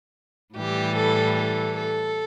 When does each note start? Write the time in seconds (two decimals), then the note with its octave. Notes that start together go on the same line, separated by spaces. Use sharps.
0.55 A2 E3 G3 G4
0.95 A4
1.36 A4
1.76 A4